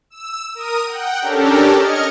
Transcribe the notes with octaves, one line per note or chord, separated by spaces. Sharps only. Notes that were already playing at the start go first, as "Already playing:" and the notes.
E6
A#4 D#6 D#7
F#5 G5
C#4 D4 G4 A4 A#4
D#5 F6 G#6 C#7